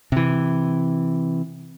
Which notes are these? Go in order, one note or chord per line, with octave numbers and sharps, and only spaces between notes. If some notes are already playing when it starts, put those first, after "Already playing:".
C3 E3